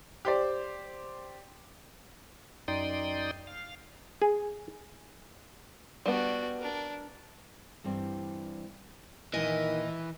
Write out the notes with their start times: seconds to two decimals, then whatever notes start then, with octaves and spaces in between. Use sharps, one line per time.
0.25 G4 C5 D5
2.68 F#2 D#4 D5 G5 C6 D#6
3.47 F5
4.22 G#4
6.06 G3 B3 D4 F#4
6.59 D4 A#4
7.84 G2 E3 G3 C4
9.34 A#2 D#3 E3 D#5